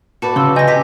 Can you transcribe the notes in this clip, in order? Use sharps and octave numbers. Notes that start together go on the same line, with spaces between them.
F#4 B4 D5 F#5 A5
C#3 C6 E6
D#5 G#5 G6 A#6
G4 A#6 B6